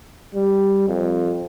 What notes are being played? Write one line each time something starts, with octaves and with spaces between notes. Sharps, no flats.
G3
F2